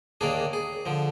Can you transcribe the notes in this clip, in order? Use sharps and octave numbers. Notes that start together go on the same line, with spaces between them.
D#2 D#3 A#3 D4 G#4
G#4
D3 F3